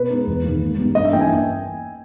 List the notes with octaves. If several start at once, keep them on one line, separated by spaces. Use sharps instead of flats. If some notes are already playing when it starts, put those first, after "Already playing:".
Already playing: B2 B4
G#3 B3 D#4
E2
D#3 A#3
G#2
G3 B3 D#4
G2 D#5
E5
E3 A#3 C#4 G5
G#5